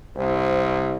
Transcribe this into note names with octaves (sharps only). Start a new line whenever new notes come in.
C2 C5